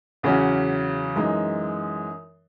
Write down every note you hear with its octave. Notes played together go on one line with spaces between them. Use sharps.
E2 C#3 F#3 C#4 F#4
F#2 E3 G#3 D#4